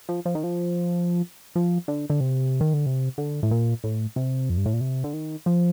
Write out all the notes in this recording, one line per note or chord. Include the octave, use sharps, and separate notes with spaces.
F3
F3
D#3
F3
F3
D3
D3
C3
D#3
D3
C3
D3
A2
A#2
A2
C3
F2
G2
A2
A#2
C3
D3
D#3
F3